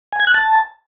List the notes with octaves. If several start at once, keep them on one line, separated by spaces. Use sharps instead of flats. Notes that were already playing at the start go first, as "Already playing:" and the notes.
G#5
G#6
F#6
A5